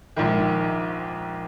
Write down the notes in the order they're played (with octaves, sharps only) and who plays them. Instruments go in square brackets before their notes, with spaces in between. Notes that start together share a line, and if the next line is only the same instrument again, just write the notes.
[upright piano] A#1 G#2 D#3